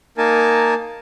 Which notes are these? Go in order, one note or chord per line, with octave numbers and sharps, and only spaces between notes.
A#3 D#4 A#4 G#5 A5